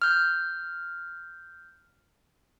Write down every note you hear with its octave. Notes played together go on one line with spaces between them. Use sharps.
F6 G6